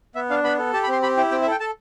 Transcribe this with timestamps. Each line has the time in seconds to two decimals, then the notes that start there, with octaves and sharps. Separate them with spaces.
0.15 B3 E5
0.30 D4 F5
0.44 B3 B5
0.59 A4
0.73 G4 A5
0.84 B5
0.88 C4 C6
1.02 G4 B5
1.17 E4 G5
1.31 C4 G5
1.42 E5
1.47 A4 G5
1.60 A4 A5